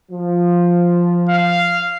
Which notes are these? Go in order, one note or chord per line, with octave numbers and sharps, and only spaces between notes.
F3
F5